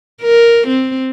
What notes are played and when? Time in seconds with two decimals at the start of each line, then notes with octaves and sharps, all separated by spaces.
0.22 A#4
0.67 C4